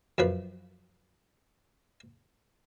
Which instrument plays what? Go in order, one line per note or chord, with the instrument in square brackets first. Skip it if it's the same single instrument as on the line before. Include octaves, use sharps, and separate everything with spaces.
[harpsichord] F#2 F3 B4